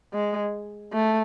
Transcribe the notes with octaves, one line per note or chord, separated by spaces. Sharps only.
G#3
A3